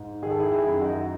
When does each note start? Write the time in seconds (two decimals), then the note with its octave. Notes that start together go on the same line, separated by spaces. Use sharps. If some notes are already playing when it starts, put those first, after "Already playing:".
Already playing: G#2
0.23 D#3 G#4
0.30 A4
0.39 E4 G#4
0.51 E4 G#4
0.67 F#2
0.81 D#4 F#4